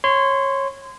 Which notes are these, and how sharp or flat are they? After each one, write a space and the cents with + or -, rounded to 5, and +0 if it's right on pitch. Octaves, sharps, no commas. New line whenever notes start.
C#5 -20 C6 -25